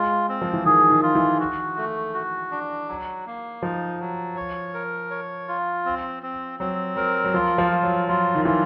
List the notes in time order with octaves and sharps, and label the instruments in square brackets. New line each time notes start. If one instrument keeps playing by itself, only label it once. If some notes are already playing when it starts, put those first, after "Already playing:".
Already playing: [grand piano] G#3 [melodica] F4
[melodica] C4
[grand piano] F3
E3
[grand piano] D#3 [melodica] G#4
[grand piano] D#3
[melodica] F4
[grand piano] E3
[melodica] F#4
A3
F#4
D4
F#3
A#3
[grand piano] F3 [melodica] D#4
[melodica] F#3
C#5
A#4
C#5
F4
C4
C4
[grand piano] F#3 [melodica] C4
[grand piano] F#3 [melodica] A#4
[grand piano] F#3
[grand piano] F3 [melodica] F4
[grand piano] F3
[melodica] F4
[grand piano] F#3
[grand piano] F#3 [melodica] F4
[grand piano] D#3
[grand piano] E3 [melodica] F4